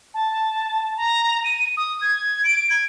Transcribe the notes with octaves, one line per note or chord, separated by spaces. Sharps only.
A5
A#5
D#7
D#6
G#6
D7
G#6